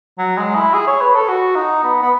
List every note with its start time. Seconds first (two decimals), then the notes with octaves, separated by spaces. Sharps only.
0.19 F#3
0.37 G#3
0.56 E4
0.74 G#4
0.87 C#5
1.01 B4
1.15 A4
1.28 F#4
1.56 D#4
1.84 B3
2.02 B3